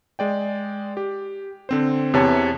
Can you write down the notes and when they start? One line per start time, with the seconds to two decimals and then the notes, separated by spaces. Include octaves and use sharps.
0.19 G#3 D5 G5
0.97 G4
1.69 D3 C4 C5
2.13 E2 C3 E3 B3 C#5 A5